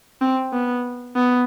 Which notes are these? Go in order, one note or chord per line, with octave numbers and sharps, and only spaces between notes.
C4
B3
B3